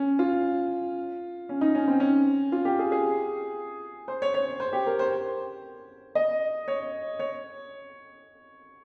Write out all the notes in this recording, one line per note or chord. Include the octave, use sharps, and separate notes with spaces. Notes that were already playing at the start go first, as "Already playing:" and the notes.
Already playing: C#4
F4
C#4
D#4
C#4
C4
C#4
F4
G4
G#4
G#4
C5
C#5
C#5
C5
G4
A#4
C5
D#5
C#5
C#5